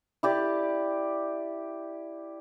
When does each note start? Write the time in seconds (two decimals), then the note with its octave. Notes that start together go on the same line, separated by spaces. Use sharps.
0.23 E4 G4 D5